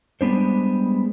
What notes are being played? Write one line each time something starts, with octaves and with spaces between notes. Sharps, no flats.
G3 G#3 B3 D4 C5